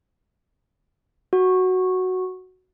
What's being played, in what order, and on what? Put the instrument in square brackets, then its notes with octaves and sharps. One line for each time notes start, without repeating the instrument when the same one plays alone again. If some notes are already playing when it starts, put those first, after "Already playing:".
[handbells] F#4